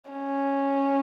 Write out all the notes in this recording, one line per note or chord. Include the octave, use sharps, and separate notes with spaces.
C#4